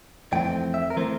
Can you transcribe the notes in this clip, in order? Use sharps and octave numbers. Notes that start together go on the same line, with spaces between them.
F2 E3 A3 C4 G5
E5
A#4
E3 A3 C4 C5